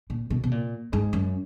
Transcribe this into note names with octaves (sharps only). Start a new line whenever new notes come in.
A#2
B2
B2
A#2
G#2
F#2